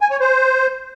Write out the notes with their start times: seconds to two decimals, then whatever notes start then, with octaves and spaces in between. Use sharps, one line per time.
0.01 G#5
0.10 C#5
0.20 C5